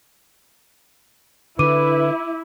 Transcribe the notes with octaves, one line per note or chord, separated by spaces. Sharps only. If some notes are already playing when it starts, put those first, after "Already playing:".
D3 E4 B4 D6 D#7